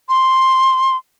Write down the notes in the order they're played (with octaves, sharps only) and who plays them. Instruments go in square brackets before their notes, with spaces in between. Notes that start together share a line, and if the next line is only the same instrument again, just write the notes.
[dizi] C6